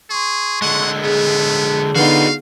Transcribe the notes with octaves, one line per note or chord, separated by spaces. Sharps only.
G#4 C6 C#6
D3 G#3 F#5
B3 G#4
D3 B3 D#4 F4 F#4 F5